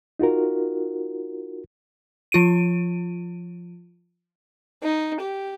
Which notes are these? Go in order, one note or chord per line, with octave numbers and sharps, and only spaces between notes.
D#4 F4 F#4 A#4
F3 F4 D7 D#7
D#4
G4